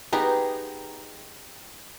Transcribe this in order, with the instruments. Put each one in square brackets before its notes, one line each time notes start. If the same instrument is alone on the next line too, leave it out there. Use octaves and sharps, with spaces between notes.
[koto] B3 [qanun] D#4 G4 G#4 [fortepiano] G5 A#5